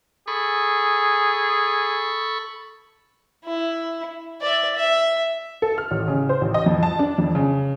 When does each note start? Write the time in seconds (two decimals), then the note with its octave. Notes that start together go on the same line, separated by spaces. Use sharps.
0.28 G#4 A4 B5 C#6
3.45 E4
4.41 D5 E5
4.76 E5
5.62 A4
5.78 F6
5.91 A1
6.08 C#3
6.29 C5
6.41 A1
6.54 D#5
6.66 F2
6.83 A5
6.99 D4
7.18 F2
7.35 C#3